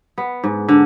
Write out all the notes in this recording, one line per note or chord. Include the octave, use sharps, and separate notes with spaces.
B3
G#2
D3